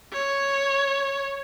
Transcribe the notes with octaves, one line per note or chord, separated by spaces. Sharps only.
C#5